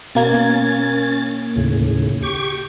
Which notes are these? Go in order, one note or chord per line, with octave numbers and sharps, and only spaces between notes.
B2 A#3 C#4 G#6 A6
D#2 A2 C#3
G4 C#6